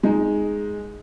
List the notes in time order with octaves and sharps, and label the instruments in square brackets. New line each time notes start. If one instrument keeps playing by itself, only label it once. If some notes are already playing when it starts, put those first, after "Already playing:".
[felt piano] G#3 D#4